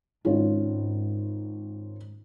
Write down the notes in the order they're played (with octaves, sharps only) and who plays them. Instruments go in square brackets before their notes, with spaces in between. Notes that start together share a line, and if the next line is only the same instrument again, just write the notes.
[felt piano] G#1 C#4 F4 [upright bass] G#2